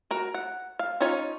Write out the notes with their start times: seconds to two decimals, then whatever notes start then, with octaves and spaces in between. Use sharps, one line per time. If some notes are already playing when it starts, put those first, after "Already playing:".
0.11 F#4 A#4
0.34 F#5
0.79 F5
1.00 C#4 D#4 F4 C#5